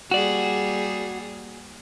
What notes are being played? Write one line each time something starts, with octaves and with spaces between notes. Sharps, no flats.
G3 A#3 F#4 G#4 D5